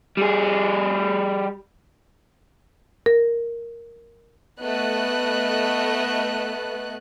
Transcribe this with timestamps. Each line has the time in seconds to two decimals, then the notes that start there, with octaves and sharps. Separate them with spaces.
0.17 G3 G#4
3.06 A#4
4.60 A3 B3 D#5 F#6